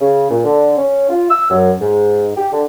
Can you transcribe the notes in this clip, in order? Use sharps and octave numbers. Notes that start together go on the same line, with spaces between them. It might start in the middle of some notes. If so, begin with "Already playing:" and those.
C#3
A#2
D3
C#4
F4
E6
F#2
G#2
G4
D3